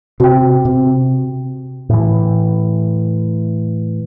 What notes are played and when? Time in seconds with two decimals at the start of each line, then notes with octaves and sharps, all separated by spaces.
0.20 C3 F#4 G5
0.65 C3
1.89 A2 E3